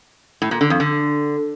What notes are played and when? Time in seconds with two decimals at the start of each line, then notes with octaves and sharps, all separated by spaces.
0.42 A2
0.51 A#2
0.61 D3
0.70 F2
0.80 D3